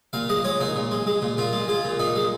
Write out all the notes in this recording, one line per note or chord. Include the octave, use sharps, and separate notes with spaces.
A#2 F5
G#3 D#5
G#3 C#5
A#2 D#4
A#2
G#3
G#3
A#2
A#2 F4
G#3
G#3 F4
A#2
A#2 D#4
G#3